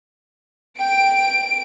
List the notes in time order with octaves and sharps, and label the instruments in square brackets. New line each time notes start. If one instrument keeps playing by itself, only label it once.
[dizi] G5 [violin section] D7